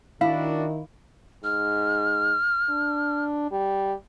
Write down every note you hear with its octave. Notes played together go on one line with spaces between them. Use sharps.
D#3 D4 E4 F#4 F5
G#2 F6
D4
G3